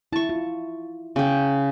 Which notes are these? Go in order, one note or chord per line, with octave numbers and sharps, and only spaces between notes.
E4 A5 C#6
F4
C#3 G5